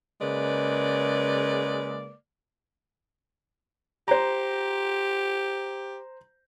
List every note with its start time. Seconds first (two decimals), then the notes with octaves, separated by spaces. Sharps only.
0.21 C#3 G#3 A#3 B4 D5
4.08 G4 C5 A#5